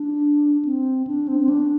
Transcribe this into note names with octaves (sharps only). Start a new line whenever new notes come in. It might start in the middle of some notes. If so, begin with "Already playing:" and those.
Already playing: D4
C4
D4
C4
C4
D4